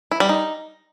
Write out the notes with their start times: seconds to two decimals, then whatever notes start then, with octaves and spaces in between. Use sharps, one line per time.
0.11 E4
0.20 G3
0.29 D#4